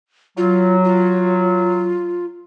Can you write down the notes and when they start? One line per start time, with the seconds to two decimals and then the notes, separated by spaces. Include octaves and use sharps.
0.37 F#3 F4
0.84 F4